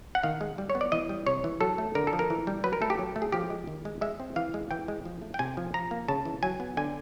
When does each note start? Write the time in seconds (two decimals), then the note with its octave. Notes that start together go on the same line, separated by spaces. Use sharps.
0.15 F#5
0.23 D#3 F5
0.41 G#3
0.58 G3
0.70 C#5
0.75 B3
0.81 D5
0.92 E3 D#5
1.09 G3
1.27 C3 C#5
1.44 E3
1.60 F#3 A4
1.78 A3
1.95 D3 A#4
2.07 A4
2.13 F3
2.19 A#4
2.30 E3
2.47 G3
2.64 F#3 B4
2.73 A#4
2.82 A3 A4
2.90 G4
2.99 F#3
3.16 A3
3.22 G#4
3.32 F3 G4
3.50 G#3
3.67 D#3
3.85 G#3
4.01 G#3 E5
4.20 C4
4.36 E3 F5
4.54 G#3
4.71 E3 G5
4.88 G#3
5.05 F3
5.22 A3
5.34 G5
5.39 C3 G#5
5.57 F3
5.74 F3 A#5
5.91 A#3
6.08 C#3 A5
6.25 E3
6.43 F#3 G#5
6.60 B3
6.77 D3 G#5